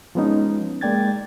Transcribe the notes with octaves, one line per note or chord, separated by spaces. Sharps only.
F3 G#3 B3 C#4 D#4
G#3 A#3 D5 G5 G#6 A6